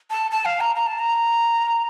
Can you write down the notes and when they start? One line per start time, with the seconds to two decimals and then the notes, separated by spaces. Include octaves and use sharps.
0.11 A5
0.31 A5
0.45 F5
0.61 A#5
0.76 A#5
0.87 A5
0.99 A#5